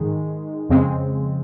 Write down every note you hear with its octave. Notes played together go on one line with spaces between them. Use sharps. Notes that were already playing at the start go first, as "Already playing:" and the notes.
Already playing: G#2 D#3 G#3
F2 C#3 G#3 C4